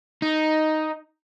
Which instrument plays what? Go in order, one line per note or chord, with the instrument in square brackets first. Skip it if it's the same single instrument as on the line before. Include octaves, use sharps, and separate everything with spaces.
[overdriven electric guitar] D#4